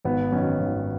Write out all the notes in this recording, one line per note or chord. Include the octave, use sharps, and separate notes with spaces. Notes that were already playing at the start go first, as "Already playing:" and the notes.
G#1 B3
F#2 D#3 C#4
G#1